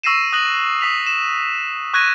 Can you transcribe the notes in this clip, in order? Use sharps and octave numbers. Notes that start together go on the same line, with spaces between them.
C#6 E6 A#6 C7 D#7 E7
D#6 F#6 A#6 F#7
D#6 B6 F7
E7
C#6 F#6 G#6 A#6 D#7